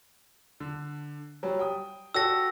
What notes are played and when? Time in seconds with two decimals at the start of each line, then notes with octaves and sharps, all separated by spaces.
0.60 D3
1.43 F#3 G3
1.59 G5 D#6
2.14 F#4 G4 A4 E6 A#6